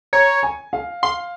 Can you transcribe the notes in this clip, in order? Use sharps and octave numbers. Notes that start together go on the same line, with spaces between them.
C#5 A#5
G#5
F5
F5 C6